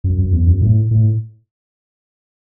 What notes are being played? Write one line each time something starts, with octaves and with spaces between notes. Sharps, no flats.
F#2
F#2
E2
F#2
A2
A2